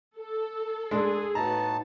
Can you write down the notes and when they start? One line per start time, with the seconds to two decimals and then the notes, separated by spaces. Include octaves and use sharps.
0.17 A4
0.91 G#3 D4 G#4
1.35 A2 B3 D#4 F#4 A5 A#5